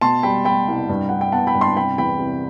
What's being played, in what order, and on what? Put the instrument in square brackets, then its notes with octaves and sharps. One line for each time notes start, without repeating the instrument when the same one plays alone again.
[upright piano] B2 A5 C6
G3 G5 B5
G3 G5 B5
C2
G2
G2 F#5
G5
B3 F#5 A5
G5 B5
G2
A5 C6
C3 G5 B5
E2 G5 B5
C3